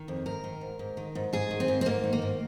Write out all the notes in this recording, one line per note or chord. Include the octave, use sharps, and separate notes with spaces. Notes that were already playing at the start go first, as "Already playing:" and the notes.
Already playing: D#3
F2
G#2 A#4
D#3
G#2
G#2
D#3
G#2
G#2 G#4
D#3
C4
G#2
C4
G#2 A#3
D#3
A#3
G#2